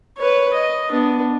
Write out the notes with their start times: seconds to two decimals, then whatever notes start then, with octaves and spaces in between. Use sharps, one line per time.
0.17 B4 C#5
0.53 D#5
0.91 B3 D4